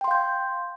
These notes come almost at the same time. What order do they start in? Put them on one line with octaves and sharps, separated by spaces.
G5 C6 F5 G6